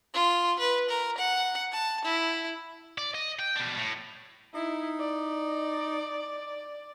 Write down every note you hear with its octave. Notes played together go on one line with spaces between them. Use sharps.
F4
B4
A#4
F#5
A5
E4
D5
D#5
G5
B2 D4
A2
D#4 E4
D5